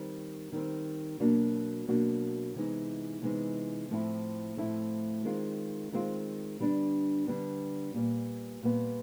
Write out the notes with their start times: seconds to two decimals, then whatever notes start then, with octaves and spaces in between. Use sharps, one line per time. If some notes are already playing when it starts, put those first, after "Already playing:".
Already playing: D#3 G3 C4
0.52 D#3 G3 C4
1.20 B2 F#3 A#3 D4 F#4
1.87 B2 F#3 A#3 D4 F#4
2.55 C3 E3 G#3 B3 D#4
3.22 C3 E3 G#3 B3 D#4
3.90 A2 F3 A3 C4 E4
4.57 A2 F3 A3 C4 E4
5.25 D#3 G#3 C4 F4
5.92 D#3 G#3 C4 F4
6.60 D3 G3 B3 D4
7.27 D3 G3 B3 D4
7.94 A#2 G3 B3
8.62 A#2 G3 B3